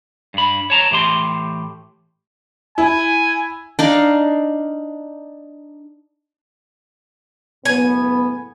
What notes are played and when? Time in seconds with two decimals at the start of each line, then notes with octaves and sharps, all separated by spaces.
0.34 G2 B5
0.70 C#5 A5 A#5
0.91 A2 E3 G4 C6
2.78 E4 G#5
3.79 D4 D#4 F5
7.65 F#1 A2 B3 G#5